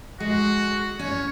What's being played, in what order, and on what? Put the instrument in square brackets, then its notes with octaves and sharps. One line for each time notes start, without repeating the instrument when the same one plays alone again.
[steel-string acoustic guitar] G#3 [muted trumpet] F#4
[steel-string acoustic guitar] C#4 [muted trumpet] C#5